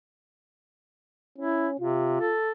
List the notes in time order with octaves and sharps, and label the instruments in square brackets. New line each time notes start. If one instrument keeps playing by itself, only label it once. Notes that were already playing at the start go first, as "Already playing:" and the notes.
[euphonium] C#4 [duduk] E4
[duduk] C3 [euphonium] F4
[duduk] A4